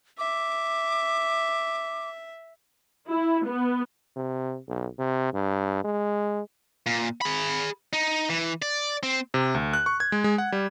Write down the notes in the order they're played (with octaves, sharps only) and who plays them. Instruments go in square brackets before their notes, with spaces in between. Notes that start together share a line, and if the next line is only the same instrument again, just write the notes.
[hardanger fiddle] E5 [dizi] D6
[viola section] E4
B3
[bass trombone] C3
B1
C3
G2
G#3
[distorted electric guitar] A#2
G#4 B5
D#4
E3
D5
C4
[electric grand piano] C3
D2
F#6
C#6
G#6
G#3
G#3
F#5
G3